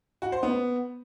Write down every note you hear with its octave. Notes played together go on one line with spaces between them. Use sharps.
F#4
C5
B3